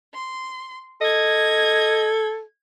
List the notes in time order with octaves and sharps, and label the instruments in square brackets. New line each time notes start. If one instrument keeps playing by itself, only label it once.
[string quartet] C6
[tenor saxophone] A4 [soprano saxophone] D#5 [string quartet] G#6